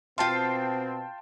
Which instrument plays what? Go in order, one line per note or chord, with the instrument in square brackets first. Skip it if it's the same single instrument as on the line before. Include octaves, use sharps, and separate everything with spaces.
[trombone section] B2 C4 [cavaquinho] F4 F5 [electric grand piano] G5 A5 C6